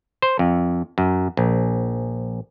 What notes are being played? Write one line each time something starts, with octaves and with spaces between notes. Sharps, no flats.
C5
F2
F#2
A#1